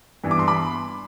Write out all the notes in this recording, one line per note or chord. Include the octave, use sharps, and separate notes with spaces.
G2 E3 B3
D6
C6
B5 D6